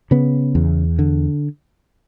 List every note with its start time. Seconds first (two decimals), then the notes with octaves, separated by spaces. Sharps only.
0.11 C#3 B3
0.55 E2
0.99 D3